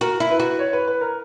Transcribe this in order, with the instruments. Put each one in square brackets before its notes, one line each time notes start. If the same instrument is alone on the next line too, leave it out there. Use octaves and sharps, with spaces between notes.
[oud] F#4 [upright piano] A#4
[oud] E4
[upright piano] B4
[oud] F#4
[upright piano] C#5
B4
B4
A#4